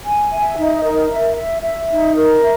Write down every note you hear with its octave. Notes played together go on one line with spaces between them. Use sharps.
G#5
E5
D#4
A#4
E5
E5
E5
D#4
A#4
E5